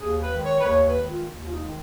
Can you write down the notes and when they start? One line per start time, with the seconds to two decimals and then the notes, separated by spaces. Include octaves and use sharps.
0.01 D#2 G#4
0.22 B4
0.33 D#3 G#3
0.44 C#5
0.60 B4
0.65 D#2 C#5
0.87 B4
0.98 D#3 G#3
1.09 F4
1.30 D#2
1.47 F4
1.50 D#4
1.62 D#3 G#3